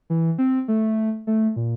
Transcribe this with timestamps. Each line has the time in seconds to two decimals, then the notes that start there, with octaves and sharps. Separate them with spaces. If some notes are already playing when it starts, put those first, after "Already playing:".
0.10 E3
0.38 C4
0.68 A3
1.27 A3
1.56 A#2